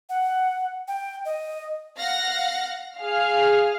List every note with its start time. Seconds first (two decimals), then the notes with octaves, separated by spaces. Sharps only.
0.09 F#5
0.88 G5
1.25 D#5
1.97 F5 F#5 A#6
2.98 G#4 F5